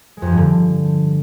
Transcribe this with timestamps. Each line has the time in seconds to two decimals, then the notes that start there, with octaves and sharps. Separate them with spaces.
0.17 G#3
0.22 F2
0.27 F3
0.32 G2
0.37 D3